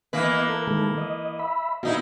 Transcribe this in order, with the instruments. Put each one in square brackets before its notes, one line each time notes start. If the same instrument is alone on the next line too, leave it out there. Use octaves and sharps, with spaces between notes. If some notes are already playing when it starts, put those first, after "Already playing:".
[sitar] E3 A#3 B4 [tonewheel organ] B3 D#5
[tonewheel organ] A4 A#4
D#3 G#3 A4
D#5
E5 B5
[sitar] A#2 D#4 E4 [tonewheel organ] B3 F#4